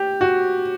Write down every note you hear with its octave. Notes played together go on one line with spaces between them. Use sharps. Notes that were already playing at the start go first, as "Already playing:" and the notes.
Already playing: G4
F#4